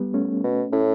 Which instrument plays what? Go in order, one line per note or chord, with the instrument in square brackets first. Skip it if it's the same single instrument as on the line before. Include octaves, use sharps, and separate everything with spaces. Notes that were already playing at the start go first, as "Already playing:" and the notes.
Already playing: [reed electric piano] G3 B3
A3 C#4
[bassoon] B2
[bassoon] A2 [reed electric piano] C#4 E4